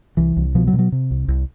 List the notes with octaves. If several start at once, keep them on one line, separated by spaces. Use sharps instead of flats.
C2 E3
C2
B2 F3
F#3
B2
F#3
C3
C2
C2